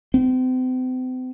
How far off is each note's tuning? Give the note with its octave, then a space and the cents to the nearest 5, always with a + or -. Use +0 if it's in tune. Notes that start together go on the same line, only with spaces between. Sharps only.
C4 -40